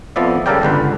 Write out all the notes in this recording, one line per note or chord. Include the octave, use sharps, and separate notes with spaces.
F2 F3 B3 D5 E5
C#3 G3 A4 A#4 D5 G5
G1 C#2 D3 B4